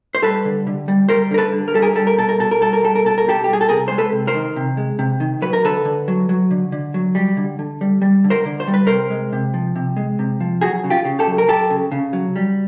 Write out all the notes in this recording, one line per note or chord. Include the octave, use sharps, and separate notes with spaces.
C5
G3 A4 B4
D3
D3
G3
G3 A#4 C5
D3 A#4
A4 B4
D3
A#4
G3 A4
G#4 A#4
G3 A4
A#4
B2 A4
A#4
B2 A4
A#4
G3 A4
A#4
G3 A4
A#4
B2 A4
A#4
B2 G4 A4
G3 G4
G#4
A4
C3 G#4 A#4
G#3 C5
A4 B4
C3
A#4 C5
D#3
C3
G#3
C3
D#3
F#3 B4
A#4
D3 A4 B4
D3
F#3
F#3
D3
D3
F#3
G3
D3
D3
G3
G3
D3
A#4 C5
D3
C5
G3
B4
C3 A#4 C5
G#3
C3
F3
C3
G#3
C3
F3
F#3 F#4 G#4
C#3
F4 G4
C#3
G4 A4
F#3
A#4
F#3 G4 A4
C#3
C#3
F#3
G3